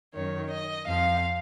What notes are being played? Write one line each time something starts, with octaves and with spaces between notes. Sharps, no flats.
F#2 D#3 C#5
D#5
F2 F3 F5